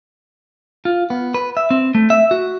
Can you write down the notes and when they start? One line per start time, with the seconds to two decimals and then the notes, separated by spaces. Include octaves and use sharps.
0.85 F4
1.10 B3
1.34 B4
1.57 E5
1.71 C4
1.95 A3
2.10 E5
2.31 F#4